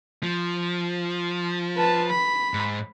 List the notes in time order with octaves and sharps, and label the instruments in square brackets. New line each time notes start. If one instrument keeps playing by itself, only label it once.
[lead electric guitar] F3
[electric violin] B4 A5
B5
[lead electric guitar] G#2